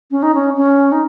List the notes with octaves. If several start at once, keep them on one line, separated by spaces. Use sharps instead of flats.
C#4
D#4
C#4
C#4
D#4